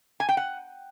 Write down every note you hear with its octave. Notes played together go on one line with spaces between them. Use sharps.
G#5
G5
F#5